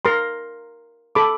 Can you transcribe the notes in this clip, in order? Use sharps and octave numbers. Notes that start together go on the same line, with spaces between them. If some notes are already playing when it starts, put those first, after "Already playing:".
A#4 A#5 C6
A4 B5 D6